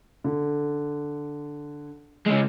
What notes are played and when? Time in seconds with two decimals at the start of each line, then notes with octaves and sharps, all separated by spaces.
0.24 D3
2.26 C#3 G#3